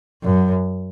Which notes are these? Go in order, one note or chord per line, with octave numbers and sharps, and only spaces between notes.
F#2